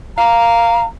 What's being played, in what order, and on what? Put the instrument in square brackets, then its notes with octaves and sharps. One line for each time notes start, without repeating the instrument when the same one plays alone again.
[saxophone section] F5 [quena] A#5